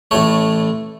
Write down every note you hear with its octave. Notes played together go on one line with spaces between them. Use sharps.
A1 A2 A3 C#5